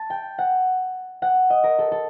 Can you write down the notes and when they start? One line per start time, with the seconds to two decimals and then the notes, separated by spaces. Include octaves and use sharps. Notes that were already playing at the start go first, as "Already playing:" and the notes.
Already playing: A5
0.10 G5
0.38 F#5
1.22 F#5
1.50 D#5
1.64 A#4
1.79 A4
1.92 A4